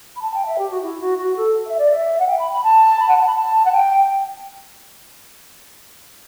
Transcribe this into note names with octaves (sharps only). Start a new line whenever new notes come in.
B5
A5
G5
E5
G4
F#4
E4
F#4
F#4
A4
E5
D5
E5
F#5
G5
B5
B5
A5
B5
F#5
A5
B5
A5
F#5
G5